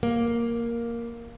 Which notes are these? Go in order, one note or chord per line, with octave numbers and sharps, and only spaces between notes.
A#3